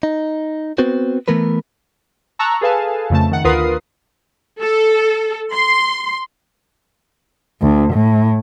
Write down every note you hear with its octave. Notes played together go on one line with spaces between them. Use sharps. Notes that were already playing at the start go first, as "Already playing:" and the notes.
D#4
B3 C4 F#4 B4 C5
E3 A3 B3 A#4 B4
A5 A#5 C#6 E6 F#6
G#4 A4 B4 F5 G#5 A5
F2 C#3 A3 A5
D#3 F#5
D2 F4 A#4 B4 D#6 C7
A4
C6
D2
A2